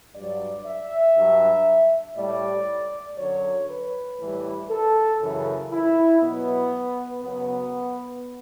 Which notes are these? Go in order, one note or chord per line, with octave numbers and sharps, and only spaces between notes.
G2 F#3 D5
E5
G2 F#3
A2 G3 D5
F#2 D3 F#3 C#5
B4
A2 E3 G3
A4
F#2 C#3 E3
E4
B2 F#3 B3
F#2 C#3 F#3 B3